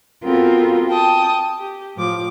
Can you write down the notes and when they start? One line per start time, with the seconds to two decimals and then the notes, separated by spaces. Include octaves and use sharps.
0.24 B3 C4 F4 F#4 A4 A#4
0.88 G5 A5 D#6
1.60 G4
1.96 A2 F3 D6